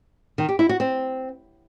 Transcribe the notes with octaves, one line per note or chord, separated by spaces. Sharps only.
D#3
G4
E4
F#4
C4